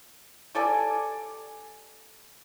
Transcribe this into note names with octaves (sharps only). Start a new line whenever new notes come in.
G3 A4 D5 G#5